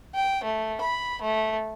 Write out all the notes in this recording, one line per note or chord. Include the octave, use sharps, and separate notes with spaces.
G5
A3
B5
A3